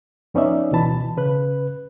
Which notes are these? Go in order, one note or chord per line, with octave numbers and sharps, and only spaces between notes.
F2 B3 C#4 D#4 D5 E5
D2 B2 E3 A5 B5
C#3 B4 F#6